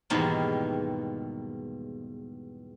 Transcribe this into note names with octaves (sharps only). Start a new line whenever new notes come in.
E2 G#2 B2 D#3 G3 A#3